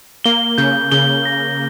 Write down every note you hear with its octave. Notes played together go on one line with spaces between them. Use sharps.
A#3 G7
C#3 G6
C#3 G7
A#6